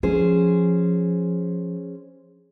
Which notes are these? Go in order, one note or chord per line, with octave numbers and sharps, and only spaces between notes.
F3 C#4 G#4 C5